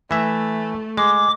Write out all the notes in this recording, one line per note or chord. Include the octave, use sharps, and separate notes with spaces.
E3 A3 E5
G#3 D6